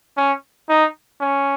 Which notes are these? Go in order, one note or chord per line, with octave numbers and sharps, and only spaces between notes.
C#4
D#4
C#4